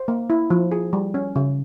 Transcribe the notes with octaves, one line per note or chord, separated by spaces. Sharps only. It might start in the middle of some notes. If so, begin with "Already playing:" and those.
Already playing: C5
A#3
E4
F3
G#4
G3
C#4
C#3